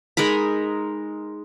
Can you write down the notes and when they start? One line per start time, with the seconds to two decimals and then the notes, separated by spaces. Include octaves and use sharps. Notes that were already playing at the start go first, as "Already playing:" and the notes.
0.17 G#3 D#4 A#4 B5